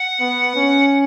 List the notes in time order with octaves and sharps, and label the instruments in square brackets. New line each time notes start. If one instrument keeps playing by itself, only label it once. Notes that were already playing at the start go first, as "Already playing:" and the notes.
Already playing: [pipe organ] F#5
[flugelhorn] B3
C#4